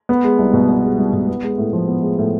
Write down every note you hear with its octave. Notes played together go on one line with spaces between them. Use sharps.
B3
G#3
C2
B2
B3
G#3
C2
B2
B3
G#3
A2
F3
B3
G#3
A2